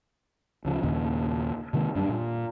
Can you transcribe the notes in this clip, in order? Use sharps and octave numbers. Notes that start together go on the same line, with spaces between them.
D2 C#3 F3
D#2 A#2 C#3
C3 D#3 G#3 A#3
F#2 G3 D4
A#2